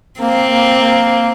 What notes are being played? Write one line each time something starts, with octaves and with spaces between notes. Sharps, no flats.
A#3 C4
A#3
A#3